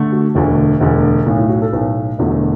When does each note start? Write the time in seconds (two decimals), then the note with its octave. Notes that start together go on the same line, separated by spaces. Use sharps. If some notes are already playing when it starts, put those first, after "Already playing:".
Already playing: D3 A3
0.12 F#4
0.35 E1 D2 D3
0.80 E1 D2 D3
1.26 B1 A2 A3
1.38 E4
1.49 F#4
1.62 A4
1.73 B1 A2 A3 B4
2.18 E1 E2 D3 F#3 A3 B3